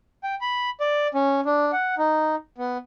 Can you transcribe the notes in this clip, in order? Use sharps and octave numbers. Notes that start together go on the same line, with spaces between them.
G5
B5
D5
C#4
D4
F#5
D#4
B3